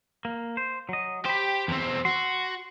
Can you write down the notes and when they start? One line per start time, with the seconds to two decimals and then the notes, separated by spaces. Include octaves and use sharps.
0.25 A#3
0.57 C5
0.89 F#3 D#5
1.26 G4 C5 B5
1.68 E2 C4
2.05 F#4 C6